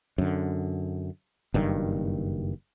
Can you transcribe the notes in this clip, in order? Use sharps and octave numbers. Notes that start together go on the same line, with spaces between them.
F#2 D3
F#1 G2 D#3